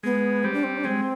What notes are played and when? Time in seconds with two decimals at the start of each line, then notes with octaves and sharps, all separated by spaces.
0.03 G#3 B3
0.44 G3 C4
0.53 D4
0.64 C4
0.78 D4
0.84 G#3 C4